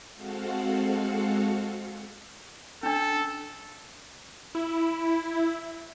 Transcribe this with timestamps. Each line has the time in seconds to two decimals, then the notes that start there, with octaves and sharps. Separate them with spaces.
0.15 G#3 C4 F#4 A4 F5 F#5
2.83 C#4 D4 A4
4.55 E4